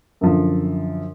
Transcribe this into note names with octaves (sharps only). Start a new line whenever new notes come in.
F#2 D3 F3